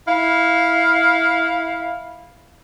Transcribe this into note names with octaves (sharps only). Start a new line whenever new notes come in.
E4 F5